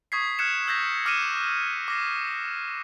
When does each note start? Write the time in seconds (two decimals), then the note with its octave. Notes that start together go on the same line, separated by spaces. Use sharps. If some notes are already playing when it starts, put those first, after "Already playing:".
0.12 C#6 D#6 G#6 B6 C7
0.39 F6 F#6 G#6 C#7 E7
0.67 E6 G6 G#6 A#6 B6
1.06 D6 F6 A#6 C#7 D#7 E7
1.88 D6 A#6 C7